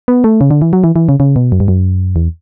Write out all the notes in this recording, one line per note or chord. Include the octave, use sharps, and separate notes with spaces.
B3
A3
C#3
D3
E3
F#3
E3
E3
C#3
C#3
B2
F#2
G2
F#2
E2